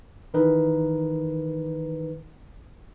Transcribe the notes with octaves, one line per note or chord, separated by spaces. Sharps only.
D#3 E3 D#4 A#4 B4